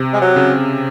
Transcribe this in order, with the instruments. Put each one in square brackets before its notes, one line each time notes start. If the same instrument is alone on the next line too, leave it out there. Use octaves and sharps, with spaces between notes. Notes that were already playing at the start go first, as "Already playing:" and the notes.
Already playing: [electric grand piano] C3
[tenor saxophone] G#3
F#3
[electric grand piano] C#3